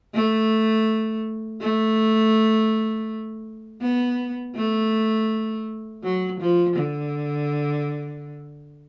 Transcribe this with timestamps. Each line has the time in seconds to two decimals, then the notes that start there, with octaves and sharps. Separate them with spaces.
0.14 A3
1.61 A3
3.82 B3
4.56 A3
6.03 F#3
6.40 F3
6.76 D3